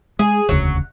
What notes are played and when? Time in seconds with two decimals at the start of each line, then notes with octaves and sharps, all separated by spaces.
0.19 G#3 G#4
0.49 E1 D2 C#3 F#3